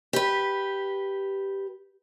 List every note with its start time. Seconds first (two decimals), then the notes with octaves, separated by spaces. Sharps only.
0.13 G4 B4